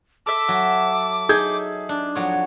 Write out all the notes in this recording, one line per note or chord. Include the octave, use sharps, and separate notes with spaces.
A4 E5 D6
F#3
D#4 G#4 G6 G#6
D4
F2 F#3 C#5